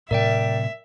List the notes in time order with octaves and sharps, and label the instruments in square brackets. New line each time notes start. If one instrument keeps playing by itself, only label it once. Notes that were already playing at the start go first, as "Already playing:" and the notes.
[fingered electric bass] A2 C3 F#3 [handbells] A#4 D5 G5 [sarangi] E5